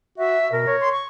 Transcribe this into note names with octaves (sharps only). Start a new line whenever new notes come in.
F#4 E5
B2 A#4
C#5
C6
C#6